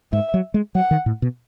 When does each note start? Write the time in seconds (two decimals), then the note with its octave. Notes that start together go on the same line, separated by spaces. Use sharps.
0.12 G#2 E5
0.34 F#3
0.54 G#3
0.75 F#3 F#5
0.91 D#3
1.06 A2
1.22 B2